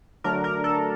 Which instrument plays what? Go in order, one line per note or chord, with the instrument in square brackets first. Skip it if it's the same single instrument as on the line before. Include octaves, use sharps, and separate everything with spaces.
[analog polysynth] D3 F#3 A3 D4 A#4
A#4
A4